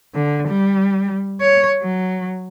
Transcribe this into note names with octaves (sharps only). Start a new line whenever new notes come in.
D3
G3
C#5
F#3